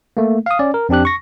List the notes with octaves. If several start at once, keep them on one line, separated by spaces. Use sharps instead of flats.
A3 A#3
F5 D#6
C#4 D5
A#4
F2 C4 D4 G4 F#6
C#6 A#6